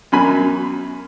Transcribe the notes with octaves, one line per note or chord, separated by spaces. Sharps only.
F#2 B2 G#5 B5